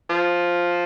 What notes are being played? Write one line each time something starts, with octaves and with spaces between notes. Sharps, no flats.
F3